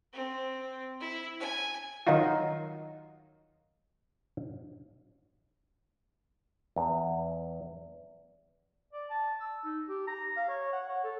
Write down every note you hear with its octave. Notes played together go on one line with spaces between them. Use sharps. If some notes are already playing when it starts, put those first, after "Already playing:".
C4
E4
G#5
D#3 F#3 D#4 F4 F#4
E2
D5
A5
E6
D#4
G4
A#5
F5
C#5
F#5
C#5
A4